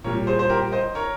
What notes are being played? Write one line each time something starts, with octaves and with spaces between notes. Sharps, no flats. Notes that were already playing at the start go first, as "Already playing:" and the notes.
A#2 G3 A#4 C#5
G#4 C5
C5
G4 A#4
C5 D#5
A#4 C#5